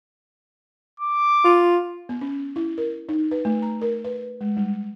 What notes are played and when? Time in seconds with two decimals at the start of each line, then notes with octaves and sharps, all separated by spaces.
1.00 D6
1.44 F4
2.09 B3
2.21 C#4
2.56 E4
2.78 A#4
3.09 D#4
3.31 B4
3.45 A3
3.62 A#5
3.81 A#4
4.04 B4
4.41 G#3
4.57 G3